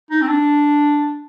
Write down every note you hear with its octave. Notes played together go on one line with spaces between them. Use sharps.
D#4
C4
D4